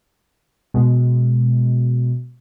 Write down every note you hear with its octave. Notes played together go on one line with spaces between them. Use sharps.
B2 G#3